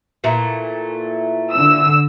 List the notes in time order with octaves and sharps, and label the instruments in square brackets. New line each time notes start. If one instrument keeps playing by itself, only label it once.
[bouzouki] A#2 E3 A3
[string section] D3 E6